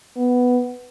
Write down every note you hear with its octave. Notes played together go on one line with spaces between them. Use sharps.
B3